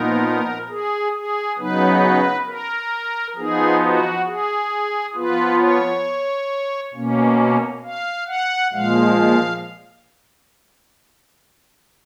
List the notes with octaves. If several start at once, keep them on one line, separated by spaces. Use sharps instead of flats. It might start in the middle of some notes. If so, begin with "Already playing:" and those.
Already playing: A#2 F3 B3 D#4 A#4
G#4
G#4
C#3 F#3 B3 D#4 B4
A#4
F3 B3 D#4 G#4
F#4
G#4
F3 B3 F4 B4
C#5
B2 A#3 C#4
F5
F#5
A#2 F3 G#3 F5